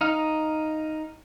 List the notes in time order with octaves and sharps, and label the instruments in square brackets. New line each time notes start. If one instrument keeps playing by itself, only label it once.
[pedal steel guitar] D#4 F5